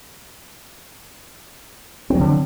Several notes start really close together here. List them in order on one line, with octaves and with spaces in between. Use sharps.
C4 F#3 D3